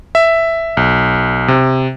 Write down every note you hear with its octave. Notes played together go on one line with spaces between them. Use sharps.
E5
B1
C3